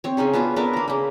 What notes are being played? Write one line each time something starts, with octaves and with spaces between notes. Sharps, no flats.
C4 C#5
C#3 C#4 D#4 G#4
B3 D4 F4 F#4
B3 D4 A#4 E5
A#3 A#5
C#3 A#3